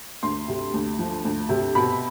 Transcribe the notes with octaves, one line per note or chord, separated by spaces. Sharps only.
D2 C6
C3
D2
F3
D2
C3
B2 B5